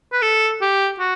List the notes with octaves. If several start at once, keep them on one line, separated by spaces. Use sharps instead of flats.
B4
A4
G4
F#4